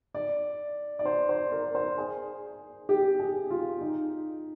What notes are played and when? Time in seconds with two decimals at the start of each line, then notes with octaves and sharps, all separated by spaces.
0.14 D5
0.99 D5
1.05 C5
1.29 C5
1.52 A#4
1.75 C5
1.98 G#4
2.89 G4
3.20 G#4
3.51 F4
3.81 D#4